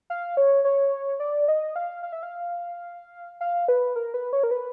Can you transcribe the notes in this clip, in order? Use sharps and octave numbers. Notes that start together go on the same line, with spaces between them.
F5
C#5
C#5
D5
D#5
F5
F5
E5
F5
F5
B4
A#4
B4
C#5
A#4
B4